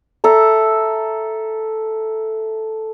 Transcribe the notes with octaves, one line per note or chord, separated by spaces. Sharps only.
A4 E5 A#5